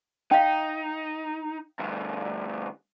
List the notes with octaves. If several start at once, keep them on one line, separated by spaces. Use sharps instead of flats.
D#4 F5 G5
D2 G2